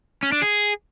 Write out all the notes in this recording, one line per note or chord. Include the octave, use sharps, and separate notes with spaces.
C#4
D4
G#4